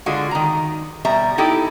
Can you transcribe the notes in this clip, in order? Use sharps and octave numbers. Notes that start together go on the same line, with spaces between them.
D3 G#3 D4 F4 F#4
D#3 A#5
B2 G3 E5 A#5
D#4 E4 G4 A4